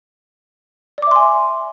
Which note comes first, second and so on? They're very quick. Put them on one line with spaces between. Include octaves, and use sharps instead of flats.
D5 D6 E5 C6 G#5